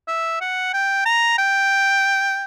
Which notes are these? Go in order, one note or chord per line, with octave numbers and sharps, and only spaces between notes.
E5
F#5
G5
A#5
G5